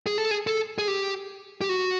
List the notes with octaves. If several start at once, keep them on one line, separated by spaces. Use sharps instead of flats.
G#4
A4
G#4
A4
G#4
G4
G4
F#4